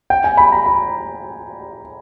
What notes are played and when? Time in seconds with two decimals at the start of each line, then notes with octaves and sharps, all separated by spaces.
0.10 G5
0.24 G#5
0.37 B5
0.52 A#5
0.66 B5